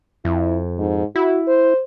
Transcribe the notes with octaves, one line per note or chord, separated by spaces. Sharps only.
F2 E4
G#2
E4 F#4
C5